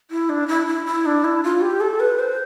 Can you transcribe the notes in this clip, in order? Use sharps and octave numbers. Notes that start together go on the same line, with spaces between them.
E4
D4
E4
E4
E4
D4
E4
F4
G4
A4
B4
C5